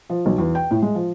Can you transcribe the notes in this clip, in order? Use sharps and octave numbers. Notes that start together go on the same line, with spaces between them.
F3
B1
E2
G5
A2
G#3
F3